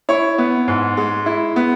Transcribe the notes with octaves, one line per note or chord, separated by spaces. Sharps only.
E4 C#5
B3
G#2
G#3
E4
B3